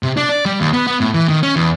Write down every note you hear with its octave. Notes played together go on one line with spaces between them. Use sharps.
C3
D4
D5
G3
D#2
B3
B3
A2
E3
D#3
C#4
E2